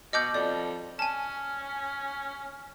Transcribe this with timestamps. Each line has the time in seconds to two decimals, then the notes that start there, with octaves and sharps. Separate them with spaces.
0.13 B2 D#5 D6 G6
0.34 F2 D5
0.99 C#4 G#5 A5